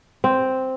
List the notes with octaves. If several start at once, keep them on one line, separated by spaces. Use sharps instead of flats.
C4